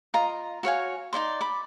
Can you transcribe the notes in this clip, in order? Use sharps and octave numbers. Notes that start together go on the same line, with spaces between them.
F4 D#5 A#5
F#4 C#5 F5 G#5
D#4 E4 D5 C6
B5 D6